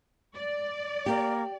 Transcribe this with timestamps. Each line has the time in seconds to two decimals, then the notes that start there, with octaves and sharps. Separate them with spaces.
0.34 D5
1.06 A#3 G4